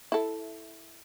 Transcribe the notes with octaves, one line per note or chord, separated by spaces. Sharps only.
E4 A4